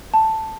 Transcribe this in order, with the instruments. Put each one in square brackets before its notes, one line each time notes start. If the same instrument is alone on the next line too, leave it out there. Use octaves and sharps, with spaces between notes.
[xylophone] A5